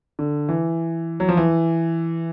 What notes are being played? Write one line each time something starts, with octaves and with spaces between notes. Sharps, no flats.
D3
E3
F#3
F3
E3